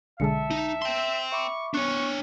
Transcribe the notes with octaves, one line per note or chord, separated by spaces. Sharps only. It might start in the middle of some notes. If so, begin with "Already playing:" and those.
B1 D3 G#3 E5 A5 C#7
D#4
G5 C6
E5 B5 C#6 D6
B3 D4 C#5 C#6 F#6 C#7